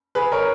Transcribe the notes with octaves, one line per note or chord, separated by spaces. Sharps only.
G#4 B4
A#4 C#5